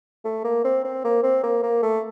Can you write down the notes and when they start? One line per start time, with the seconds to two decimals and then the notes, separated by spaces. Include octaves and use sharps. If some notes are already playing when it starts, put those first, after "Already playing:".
0.25 A3
0.44 A#3
0.64 C4
0.84 C4
1.04 A#3
1.23 C4
1.43 A#3
1.63 A#3
1.82 A3